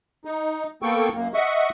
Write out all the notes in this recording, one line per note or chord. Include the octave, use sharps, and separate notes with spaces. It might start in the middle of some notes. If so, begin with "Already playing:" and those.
D#4
A#3 B3 A4 G5 C#6
F#2 A#3
D#5 E5 F#5 C#6